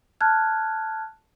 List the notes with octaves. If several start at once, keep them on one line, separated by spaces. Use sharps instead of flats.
A5 F6 F#6 G#6